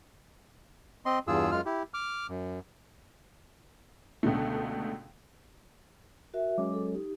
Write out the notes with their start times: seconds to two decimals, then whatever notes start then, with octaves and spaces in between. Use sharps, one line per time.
1.06 C4 D#5 C6
1.27 E2 G2 F4 G#4 E6
1.52 F#2 G#3 F4 F6
1.66 E4 G4
1.94 D6 F6
2.29 F#2
4.23 C#2 B2 D3 A3
6.34 F#4 A#4 E5
6.58 F#3 G#3 C#4 D6
6.74 A4
6.93 D#4 G4